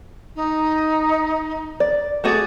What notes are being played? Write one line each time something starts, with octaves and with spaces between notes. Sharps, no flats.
D#4
D5
A3 F#4 G#4 D5